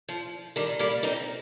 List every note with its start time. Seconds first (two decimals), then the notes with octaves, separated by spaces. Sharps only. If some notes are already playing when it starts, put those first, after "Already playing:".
0.09 F3
0.56 D#3 G3
0.79 G3 A#3
1.03 C4 D#4